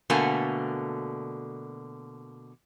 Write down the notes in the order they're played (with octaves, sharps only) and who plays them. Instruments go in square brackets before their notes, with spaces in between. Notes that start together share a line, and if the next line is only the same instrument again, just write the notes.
[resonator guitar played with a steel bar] B2 D3 A3 A#3 G#5